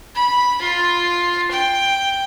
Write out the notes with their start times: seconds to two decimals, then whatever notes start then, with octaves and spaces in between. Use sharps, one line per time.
0.15 B5
0.61 F4
1.51 G5